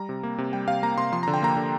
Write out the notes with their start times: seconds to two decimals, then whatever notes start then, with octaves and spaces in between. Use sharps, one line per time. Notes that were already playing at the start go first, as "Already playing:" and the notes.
Already playing: G3 A#5
0.09 C3
0.23 A#3
0.38 C3
0.53 G3 G5
0.68 C3 F5
0.83 A#3 A#5
0.97 C3 C6
1.12 F3 C6
1.23 D3 A#5
1.34 G5
1.42 A#3 A#5
1.56 D3